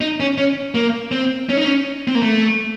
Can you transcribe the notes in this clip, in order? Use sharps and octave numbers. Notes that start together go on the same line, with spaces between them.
D#4
C#4
C#4
A#3
C4
C#4
D#4
C#4
C4
A#3
A3